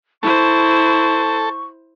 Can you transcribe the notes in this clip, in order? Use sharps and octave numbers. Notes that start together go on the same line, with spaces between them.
E4 A4 C5 C#6